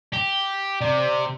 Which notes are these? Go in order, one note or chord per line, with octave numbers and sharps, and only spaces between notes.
G4
C3 D5